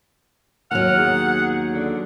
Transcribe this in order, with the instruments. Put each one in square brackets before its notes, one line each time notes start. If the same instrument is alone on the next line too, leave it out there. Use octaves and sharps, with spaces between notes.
[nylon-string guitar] D#2 F#3 [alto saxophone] F#5 [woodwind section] F6
[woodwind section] B3 D#4 G#4
[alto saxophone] D3